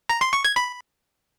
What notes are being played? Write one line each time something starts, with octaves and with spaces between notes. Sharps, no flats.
A#5
C6
C#6
G#6
B5